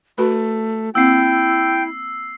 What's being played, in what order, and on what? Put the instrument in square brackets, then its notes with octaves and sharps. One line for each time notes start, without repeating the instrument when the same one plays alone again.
[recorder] A3 [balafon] F#4 B4 B5
[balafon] A#3 C4 [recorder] E4 [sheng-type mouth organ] G5 [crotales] E6 C7